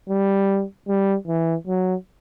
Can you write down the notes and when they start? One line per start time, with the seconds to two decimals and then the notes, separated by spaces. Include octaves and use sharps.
0.09 G3
0.88 G3
1.27 E3
1.67 F#3